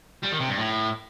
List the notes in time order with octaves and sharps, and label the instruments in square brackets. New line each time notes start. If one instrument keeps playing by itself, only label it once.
[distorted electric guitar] G3
D#3
C3
G2
A2